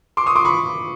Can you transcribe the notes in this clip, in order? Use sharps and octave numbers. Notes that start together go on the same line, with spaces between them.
C6 D6
C#6 D#6
C6 D6
B5 C#6